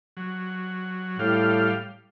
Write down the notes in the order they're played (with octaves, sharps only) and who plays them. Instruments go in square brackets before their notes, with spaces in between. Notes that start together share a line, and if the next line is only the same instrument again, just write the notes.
[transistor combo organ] F#3
[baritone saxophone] A2 [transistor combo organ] G3 F5